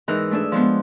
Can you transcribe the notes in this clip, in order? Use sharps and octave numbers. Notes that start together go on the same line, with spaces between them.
G#2 E3 D#4 A#4 F#6
A3 D4 G#4 A4
F3 G#3 B3